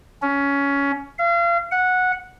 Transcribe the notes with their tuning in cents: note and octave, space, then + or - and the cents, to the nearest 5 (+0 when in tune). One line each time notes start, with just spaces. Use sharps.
C#4 +15
F5 -35
F#5 -10